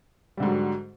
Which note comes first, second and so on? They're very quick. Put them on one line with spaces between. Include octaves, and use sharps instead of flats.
G3 D3 G#2 F#3